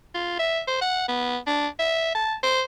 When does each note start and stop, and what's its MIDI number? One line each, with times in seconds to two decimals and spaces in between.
0.15 0.35 65
0.39 0.61 76
0.67 0.81 72
0.81 1.08 78
1.08 1.37 59
1.47 1.67 62
1.79 2.14 76
2.15 2.35 81
2.43 2.61 72